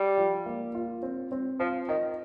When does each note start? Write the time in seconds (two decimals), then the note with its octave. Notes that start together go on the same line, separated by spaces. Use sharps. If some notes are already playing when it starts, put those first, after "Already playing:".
Already playing: G3
0.18 F3
0.46 A#3
0.75 F4
1.03 C4
1.32 C4
1.59 F3 F4
1.88 D#3 D#5